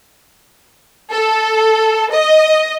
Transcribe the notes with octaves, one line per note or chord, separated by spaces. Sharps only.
A4
D#5